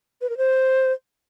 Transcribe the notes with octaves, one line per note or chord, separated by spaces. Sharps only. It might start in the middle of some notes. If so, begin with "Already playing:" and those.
B4
A#4
C5